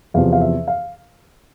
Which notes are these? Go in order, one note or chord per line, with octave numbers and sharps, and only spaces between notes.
E2 C3 F3 F5
F5
E5
F5